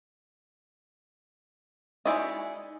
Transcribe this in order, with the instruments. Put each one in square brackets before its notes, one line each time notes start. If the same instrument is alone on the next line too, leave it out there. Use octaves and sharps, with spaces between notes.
[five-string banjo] G#3 E4 F#4 [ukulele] D#4 D5 D#5